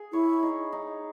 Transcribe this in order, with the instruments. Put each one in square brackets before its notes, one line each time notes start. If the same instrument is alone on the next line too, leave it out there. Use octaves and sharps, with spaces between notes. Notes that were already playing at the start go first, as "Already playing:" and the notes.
Already playing: [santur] G#4
[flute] E4 [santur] C#5
[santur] D#4
D#4